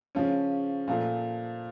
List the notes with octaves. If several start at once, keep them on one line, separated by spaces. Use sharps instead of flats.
C#3 F3 C#4
A#2 F3 A3